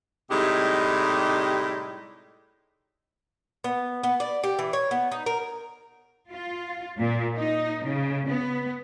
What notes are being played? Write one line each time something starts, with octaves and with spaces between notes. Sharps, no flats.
A2 C3 G3 G#3 D#4 G4
B3
B3
D5
G4
E3
C#5
B3
D#4
A#4
F4
A#2
D#4
C#3
B3